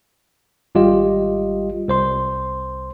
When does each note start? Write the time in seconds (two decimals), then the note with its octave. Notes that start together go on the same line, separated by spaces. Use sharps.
0.75 G#1 G3 F4 G4 D#5
1.88 C2 C5 C6